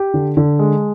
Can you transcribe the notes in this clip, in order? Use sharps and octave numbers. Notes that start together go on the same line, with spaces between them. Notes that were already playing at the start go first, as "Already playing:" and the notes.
Already playing: G4
D3
D3
G#3